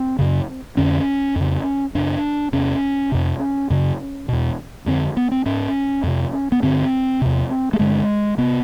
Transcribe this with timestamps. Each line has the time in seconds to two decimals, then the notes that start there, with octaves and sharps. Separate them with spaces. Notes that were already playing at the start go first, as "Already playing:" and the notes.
Already playing: C4
0.19 F#2 C#3
0.77 F2 D3 C#4
1.36 F2 C#3
1.95 F#2 C#3 D4
2.53 E2 C3 C#4
3.12 F2 C3
3.70 F#2 C#3
4.29 E2 B2
4.86 F2 D3 C4
5.17 B3
5.31 C4
5.46 G#2 C#4
6.03 F2 C3
6.52 B3
6.62 G2 D3 C4
7.22 E2 C3
7.73 A3
7.79 G2 D3 G#3
8.38 C3 B3